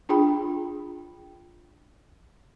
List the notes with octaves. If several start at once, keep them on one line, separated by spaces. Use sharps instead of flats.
D4 F4 G#4 G5 B5